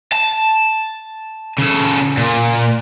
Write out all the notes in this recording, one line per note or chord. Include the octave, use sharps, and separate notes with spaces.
A5
C#3 A4
A#2